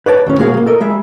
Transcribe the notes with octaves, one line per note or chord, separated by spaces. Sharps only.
B4 C#5 D5 A5
D2 A2 C#4
B2 G#3 A#3 F#4 G#4 F5
F#3 A#3
A4 A#4 D#5
G3 G#3 E5